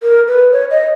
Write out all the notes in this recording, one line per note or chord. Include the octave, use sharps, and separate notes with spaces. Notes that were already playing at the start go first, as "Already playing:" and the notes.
A#4
B4
C#5
D#5